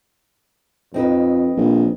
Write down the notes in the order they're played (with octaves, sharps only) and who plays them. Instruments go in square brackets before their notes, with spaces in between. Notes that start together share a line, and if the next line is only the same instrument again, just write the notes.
[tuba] F2 [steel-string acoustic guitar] C4 D#4 B4
[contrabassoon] A#1 [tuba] A#3